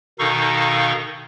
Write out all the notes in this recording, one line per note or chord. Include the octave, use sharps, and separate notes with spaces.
B2 D#3 D#4 A4 F5 C#6